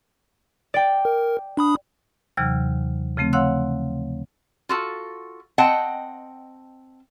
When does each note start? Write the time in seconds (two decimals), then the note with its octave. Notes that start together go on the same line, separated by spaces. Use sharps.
0.74 D5 G5
1.05 A#4
1.57 D4 B5 D#6
2.37 D#2 C3 E3 F#3 F6
3.17 C#3 F3 A3 C4
3.33 C#5 F5 F#5 C6 E6 F#6
4.69 F4 F#4 A4
5.58 C4 D#5 F#5 G5 A5